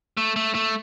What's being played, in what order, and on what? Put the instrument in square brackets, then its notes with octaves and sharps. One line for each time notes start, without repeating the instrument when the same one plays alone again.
[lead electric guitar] A3
A3
A3